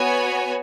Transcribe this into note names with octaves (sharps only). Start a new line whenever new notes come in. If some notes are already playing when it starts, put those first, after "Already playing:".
Already playing: B3 F#4 C#5 G#5